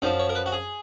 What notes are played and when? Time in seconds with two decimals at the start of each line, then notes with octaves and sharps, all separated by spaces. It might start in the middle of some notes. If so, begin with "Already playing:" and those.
0.02 F#2 F3 D#4
0.19 C#5
0.29 A#4
0.35 B4
0.46 F#4
0.52 G#4